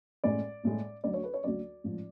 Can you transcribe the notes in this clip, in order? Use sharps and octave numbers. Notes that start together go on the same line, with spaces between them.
A1 A2 G#3 D5
A1 A2 G#3
D2 D3 F#3 D5
C#5
B4
C#5
D2 D3 F#3 D5
A1 G#2 F3